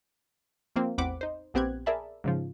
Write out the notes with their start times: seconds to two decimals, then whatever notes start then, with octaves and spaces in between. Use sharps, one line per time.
0.76 F3 A#3 C4
0.98 A1 E2 C4 F#5 B5 D6
1.21 D#4 C5
1.54 A#1 B3 C4 G4 F#6 G#6
1.86 G#4 A#4 D5 E5 A5 B5
2.24 G#2 C#3 F3